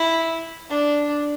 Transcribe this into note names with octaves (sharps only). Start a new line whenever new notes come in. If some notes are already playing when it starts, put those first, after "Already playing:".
Already playing: E4
D4